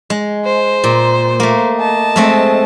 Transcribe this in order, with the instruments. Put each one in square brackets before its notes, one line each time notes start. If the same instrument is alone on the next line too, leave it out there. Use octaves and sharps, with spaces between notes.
[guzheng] G#3
[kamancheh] C5
[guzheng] A#2
A3 A#3
[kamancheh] D#5 A5
[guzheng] G#3 A3 C4